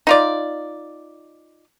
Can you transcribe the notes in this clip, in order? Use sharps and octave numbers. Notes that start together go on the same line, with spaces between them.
D#4 F4 D5